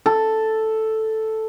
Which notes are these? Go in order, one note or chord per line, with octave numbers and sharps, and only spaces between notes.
A4